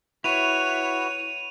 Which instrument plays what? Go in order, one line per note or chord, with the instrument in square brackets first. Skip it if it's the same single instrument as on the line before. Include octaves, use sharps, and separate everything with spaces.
[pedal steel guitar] E4 [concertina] F#4 B4 [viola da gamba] C#5 [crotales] D#7 F7